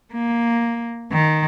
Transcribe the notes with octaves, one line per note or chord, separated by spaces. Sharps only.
A#3
D#3